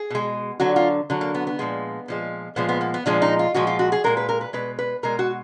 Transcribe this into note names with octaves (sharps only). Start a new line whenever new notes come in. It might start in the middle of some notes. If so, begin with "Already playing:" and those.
Already playing: G#4
B2 G#3
D3 F#3 F#4
F4
D3 F#3
A#3
B3
B3
A#2 F3 G#3
A#2 F3 G#3
A#2 F3 G#3 B3
B3
A#3
B3
A#2 F3 G#3 D4
D#4
F4
A#2 F3 G#3 F#4
F4
F#4
G#4
A#2 F3 G#3 A#4
B4
A#4
B4
B2 G#3 B4
B4
B2 G#3 A#4
F#4